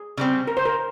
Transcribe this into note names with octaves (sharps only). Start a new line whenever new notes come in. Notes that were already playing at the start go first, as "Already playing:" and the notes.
Already playing: G#4
C#3 G3 C4
A#4
C5
A#4